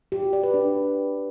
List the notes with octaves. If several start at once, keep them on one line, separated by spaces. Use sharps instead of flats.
G4
F#4
D5
B4
D4